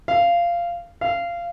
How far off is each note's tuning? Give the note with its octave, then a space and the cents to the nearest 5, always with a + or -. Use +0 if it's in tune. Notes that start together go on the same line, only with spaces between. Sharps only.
F5 -15
F5 -20